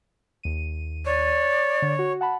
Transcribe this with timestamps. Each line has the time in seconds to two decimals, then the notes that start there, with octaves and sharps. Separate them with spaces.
0.43 D#2 D#7
1.06 C#5 D5
1.82 D3
1.99 F#4
2.21 F#5 A5 B5